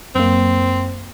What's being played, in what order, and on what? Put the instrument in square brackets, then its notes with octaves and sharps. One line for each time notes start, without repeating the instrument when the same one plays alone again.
[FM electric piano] F#2 A#3 [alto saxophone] C4